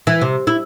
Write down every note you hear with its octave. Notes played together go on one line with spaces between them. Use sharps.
E3
C3
E4